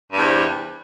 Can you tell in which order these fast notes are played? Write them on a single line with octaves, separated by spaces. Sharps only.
G2 E2 C3